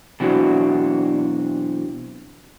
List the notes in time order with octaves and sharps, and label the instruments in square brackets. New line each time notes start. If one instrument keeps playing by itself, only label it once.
[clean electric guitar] B2 E3 F#3 C4 D4 F#4